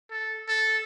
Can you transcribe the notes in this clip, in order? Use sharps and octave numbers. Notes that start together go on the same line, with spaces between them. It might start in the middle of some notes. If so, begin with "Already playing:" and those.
A4
A4